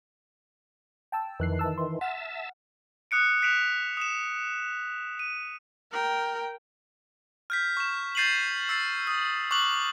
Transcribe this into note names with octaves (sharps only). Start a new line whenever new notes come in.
G5 A5 E6
F2 D#3 E3 F#6 C7
A5 E6
C6
E5 F#5 A5 F6
D#6 F#6 C#7 D7
F#6 B6 D7 E7 F7
D#6 E7
D#7
A#4 G5
F6 G6 B6
C#6 E7
G6 A6 C7 D#7 F7 F#7
E6 A6 C7
D#6 E6 G6
C#6 D6 F6 F#6 F#7